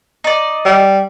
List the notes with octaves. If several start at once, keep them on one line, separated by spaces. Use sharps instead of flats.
D#4 D5
G3